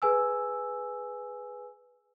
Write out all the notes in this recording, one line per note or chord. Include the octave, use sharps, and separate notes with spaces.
G#4 B4 G#5 E6